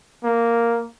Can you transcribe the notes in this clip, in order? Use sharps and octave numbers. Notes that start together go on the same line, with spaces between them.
A#3